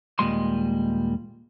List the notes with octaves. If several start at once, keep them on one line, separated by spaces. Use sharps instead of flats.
D#2 A#2 G3 G#3 D#5 C6